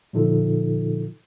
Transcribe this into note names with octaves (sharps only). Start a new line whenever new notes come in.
A#2 D3 F3 D#4 F4 A4